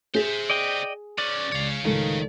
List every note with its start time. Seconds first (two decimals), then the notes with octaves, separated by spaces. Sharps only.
0.15 G#4 C5 E5
0.50 D5 D#5 G5
1.18 B3 C#4 D5
1.52 C#2 C#5 F5
1.85 C#2 A2 D#3 F3 G#3 A4